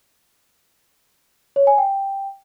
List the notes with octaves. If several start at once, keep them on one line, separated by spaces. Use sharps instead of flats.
C#5
G#5
G5